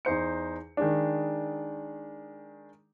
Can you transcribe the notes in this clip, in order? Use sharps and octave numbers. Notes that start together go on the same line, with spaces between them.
E2 D#4 C5 C#7
D#3 G#3 D4